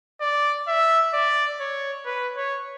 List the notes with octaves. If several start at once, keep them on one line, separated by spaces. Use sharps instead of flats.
D5
E5
D5
C#5
B4
C#5